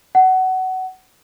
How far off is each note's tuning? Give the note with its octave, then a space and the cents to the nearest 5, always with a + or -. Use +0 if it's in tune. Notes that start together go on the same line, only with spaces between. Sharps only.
F#5 +20